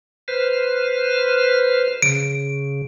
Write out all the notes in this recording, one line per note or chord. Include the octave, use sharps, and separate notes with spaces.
B4 C5 F6
C#3 D7